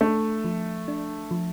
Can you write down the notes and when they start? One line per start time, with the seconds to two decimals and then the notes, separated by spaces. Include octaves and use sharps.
0.01 A3 D4
0.44 F3
0.88 D4
1.31 F3